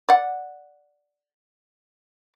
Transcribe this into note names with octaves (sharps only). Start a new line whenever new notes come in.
D5 F#5